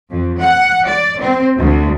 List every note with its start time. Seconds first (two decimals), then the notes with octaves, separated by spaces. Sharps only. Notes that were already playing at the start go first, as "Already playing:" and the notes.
0.11 F2
0.40 F#5
0.87 D5
1.21 C4
1.58 D2